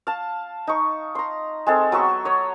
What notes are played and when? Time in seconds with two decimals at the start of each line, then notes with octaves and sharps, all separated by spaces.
0.07 F5 A5
0.67 D#4 C#6
1.15 A#5 C6
1.67 G#3 C4 A4
1.92 F#3 B3 E5 C#6
2.25 C#5 D#5